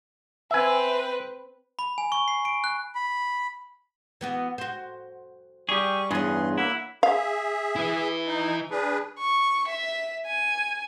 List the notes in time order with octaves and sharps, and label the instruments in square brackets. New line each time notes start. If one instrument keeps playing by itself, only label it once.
[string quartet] C4 B4 [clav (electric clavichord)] E5 G#5
[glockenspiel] B5
G#5
C#6
C7
D7
F#6
[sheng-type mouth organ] B5
[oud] E3 B3 F#4
F#4 C5
[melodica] G3 C#6 [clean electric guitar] G4 G#4
[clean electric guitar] E2 G2 G#4 [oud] C#4 D4 [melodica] B4 C6
[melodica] A#3 F#5 E6 [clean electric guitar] E4
[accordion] G#4 E5 [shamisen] F5
[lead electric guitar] E4 B4
[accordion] D#4
D4 G#4 B4
[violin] C#6
E5
G#5